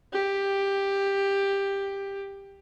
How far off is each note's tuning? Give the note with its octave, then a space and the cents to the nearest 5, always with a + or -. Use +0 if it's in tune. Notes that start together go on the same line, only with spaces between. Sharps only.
G4 +10